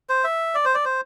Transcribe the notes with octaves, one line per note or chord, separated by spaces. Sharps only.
C5
E5
D5
C5
D5
C5